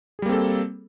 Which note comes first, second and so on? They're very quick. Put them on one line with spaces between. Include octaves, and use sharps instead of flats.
G#4 G3 A#3 C4 A4